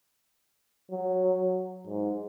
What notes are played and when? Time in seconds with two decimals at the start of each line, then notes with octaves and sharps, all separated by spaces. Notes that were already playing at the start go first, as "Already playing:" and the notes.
0.91 F#3
1.87 G#2